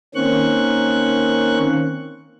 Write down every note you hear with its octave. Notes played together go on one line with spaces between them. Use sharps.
D#3 A#3 C4 C#4 C#6 F#6